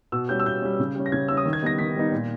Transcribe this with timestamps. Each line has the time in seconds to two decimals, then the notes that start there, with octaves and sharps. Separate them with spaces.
0.12 B2 E6
0.29 G3 C#4 G6
0.40 E6
0.46 B2 G6
0.62 G3 C#4
0.79 C#3
0.95 G3 C#4
1.06 A#6
1.12 C#3 G#6
1.28 G3 C#4 E6
1.37 D#6
1.46 D#3
1.53 G#6
1.62 G3 B3 D#4 A#6
1.78 D#3 B6
1.96 G3 B3 D#4
2.12 A#2